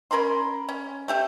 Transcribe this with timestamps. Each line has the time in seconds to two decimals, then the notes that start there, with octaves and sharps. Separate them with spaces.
0.11 C#4 A#4 B5 C6
0.69 C#4
1.08 A3 G4 E5